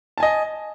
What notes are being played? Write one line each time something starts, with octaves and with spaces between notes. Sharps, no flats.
D#5 G#5 A5